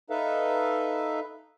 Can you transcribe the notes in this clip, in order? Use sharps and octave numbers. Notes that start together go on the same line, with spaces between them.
D#4 A4 B4 E5 F5